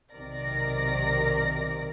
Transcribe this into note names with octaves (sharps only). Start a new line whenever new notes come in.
B1 C3 D#3 A#4 D5 A#6